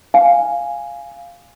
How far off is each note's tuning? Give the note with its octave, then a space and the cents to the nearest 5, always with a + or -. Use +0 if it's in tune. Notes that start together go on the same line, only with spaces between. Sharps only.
F5 +0 G#5 -5